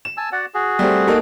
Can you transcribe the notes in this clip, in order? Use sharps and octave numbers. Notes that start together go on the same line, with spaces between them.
E7
G#5 A5 E6
F#4 D5 F#5
F#4 G#4
G3 A3 C4
A#3 D#4 A4